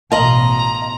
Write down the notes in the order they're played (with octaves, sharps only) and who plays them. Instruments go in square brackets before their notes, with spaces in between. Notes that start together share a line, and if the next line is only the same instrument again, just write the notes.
[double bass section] A1 B2 [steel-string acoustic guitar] D#5 F5 [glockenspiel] A5 C6 F#7 [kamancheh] A#5